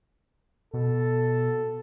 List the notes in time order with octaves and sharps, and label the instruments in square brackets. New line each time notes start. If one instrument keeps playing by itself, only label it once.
[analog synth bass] B2 [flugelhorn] A4